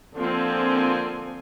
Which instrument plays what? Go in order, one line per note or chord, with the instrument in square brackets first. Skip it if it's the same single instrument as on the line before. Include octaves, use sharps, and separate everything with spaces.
[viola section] D3 F3 A#3 C4 G#5